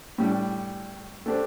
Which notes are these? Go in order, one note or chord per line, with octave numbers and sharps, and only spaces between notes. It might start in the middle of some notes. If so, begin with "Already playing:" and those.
A2 G3 D4
A3 D4 G4 C5